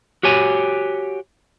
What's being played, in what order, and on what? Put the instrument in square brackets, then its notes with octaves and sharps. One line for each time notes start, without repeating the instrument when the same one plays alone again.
[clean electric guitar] F#4 G4 C#5 G#5